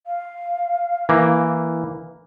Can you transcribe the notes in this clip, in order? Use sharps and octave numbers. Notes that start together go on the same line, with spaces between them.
F5
E3 A#3